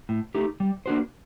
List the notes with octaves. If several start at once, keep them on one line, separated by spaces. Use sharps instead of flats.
A2
A3 D#4 G4
G3
A#3 D4 F#4 C5